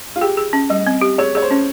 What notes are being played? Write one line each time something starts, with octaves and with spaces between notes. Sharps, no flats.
F4
G4 G#4
G#4
C#4
G3 D#5
C4
G4
G#4 C#5
G#4 C#5
C5
C#4